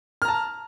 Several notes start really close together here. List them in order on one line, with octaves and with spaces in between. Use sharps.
F6 A#5 A5